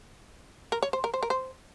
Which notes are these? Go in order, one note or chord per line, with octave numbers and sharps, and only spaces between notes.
A#4
C#5
C5
A#4
C5
A#4
C5